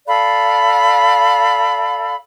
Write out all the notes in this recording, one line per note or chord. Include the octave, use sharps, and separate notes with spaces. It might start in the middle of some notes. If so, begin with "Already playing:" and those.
A4 D5 F5 B5